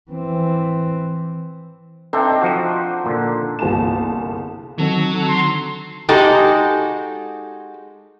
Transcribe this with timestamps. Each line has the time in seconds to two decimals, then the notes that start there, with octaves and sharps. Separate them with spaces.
0.11 E3 C4
2.13 C4 D4 D#4 A4 E5 G5
2.42 F3 F#4
3.06 A#2 D3
3.59 G1 C2 A#3 G#4 A5 E7
4.78 D#3 F#3 C4 D#4 A4
5.29 D3 C6
6.09 G#3 D#4 F#4 G4 A4